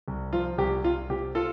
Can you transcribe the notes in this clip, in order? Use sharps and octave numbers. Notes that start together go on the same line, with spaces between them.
C2
F3 F4
C2 G4
C2 F4
C3 G4
F4 A4